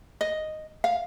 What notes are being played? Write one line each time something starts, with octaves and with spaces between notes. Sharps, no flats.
D#5
F5